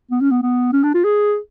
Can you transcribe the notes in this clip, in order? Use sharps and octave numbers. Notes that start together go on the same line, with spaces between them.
B3
C#4
B3
B3
C#4
D4
F4
G#4